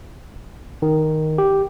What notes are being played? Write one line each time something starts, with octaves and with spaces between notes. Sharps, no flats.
D#3
G4